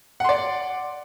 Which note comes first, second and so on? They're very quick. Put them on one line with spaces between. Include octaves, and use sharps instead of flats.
F#5 C6 D5